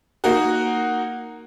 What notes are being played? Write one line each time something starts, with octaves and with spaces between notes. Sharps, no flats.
A#3 D#4 F#4